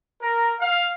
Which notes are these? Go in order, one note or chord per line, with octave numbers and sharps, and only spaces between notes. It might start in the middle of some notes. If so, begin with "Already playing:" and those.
A#4
F5